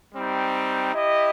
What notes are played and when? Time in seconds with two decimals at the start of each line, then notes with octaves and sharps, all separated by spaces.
0.14 G3 C4 D#4
0.95 E4 G4 D#5